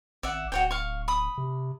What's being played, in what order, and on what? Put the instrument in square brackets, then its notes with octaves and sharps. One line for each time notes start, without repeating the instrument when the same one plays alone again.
[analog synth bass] G#1 [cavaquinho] D5 E5 F#5
[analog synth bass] D1 [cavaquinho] F#4 C#5 G5
[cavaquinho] F5 C#6
B5 D#6
[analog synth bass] C3